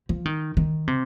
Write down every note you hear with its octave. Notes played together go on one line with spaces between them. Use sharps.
F3
D#3
D#3
C3